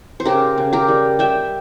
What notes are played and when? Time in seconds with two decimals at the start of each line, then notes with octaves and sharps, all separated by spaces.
0.20 C5
0.25 C#3 G4 A#4
0.58 C#3
0.73 G4 A#4
0.88 G3
1.19 G3 E5 G5